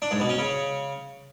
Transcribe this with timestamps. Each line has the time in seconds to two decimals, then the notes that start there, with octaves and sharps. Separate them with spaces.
0.02 D4
0.11 G#2
0.20 B2
0.29 C#4
0.38 C#3